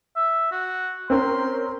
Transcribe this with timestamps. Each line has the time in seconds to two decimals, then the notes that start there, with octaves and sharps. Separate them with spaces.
0.16 E5
0.51 F#4
1.10 C4 C#4 A#4 C6